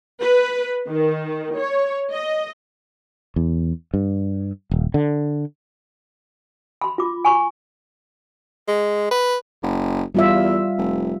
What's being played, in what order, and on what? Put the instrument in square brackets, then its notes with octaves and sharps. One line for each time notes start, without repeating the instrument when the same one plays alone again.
[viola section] B4
D#3
C#5
D#5
[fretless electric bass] E2
G2
D#1
D3
[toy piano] B5 C6
F4 D6
G#5 B5 C#6
[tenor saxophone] G#3
B4
[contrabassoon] F#1
[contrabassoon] E2 [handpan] G3 F4 E5
[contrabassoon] F1